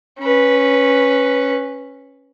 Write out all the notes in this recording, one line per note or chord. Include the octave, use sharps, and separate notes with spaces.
C#4 B4